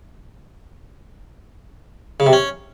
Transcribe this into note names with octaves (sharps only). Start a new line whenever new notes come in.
C#3
C3
C#4